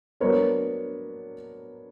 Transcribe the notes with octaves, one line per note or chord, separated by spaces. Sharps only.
F#3 B3 D4 A#4 C#5